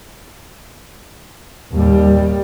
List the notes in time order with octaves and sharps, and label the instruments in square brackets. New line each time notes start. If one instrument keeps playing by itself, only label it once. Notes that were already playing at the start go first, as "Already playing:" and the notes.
[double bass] D#2 G3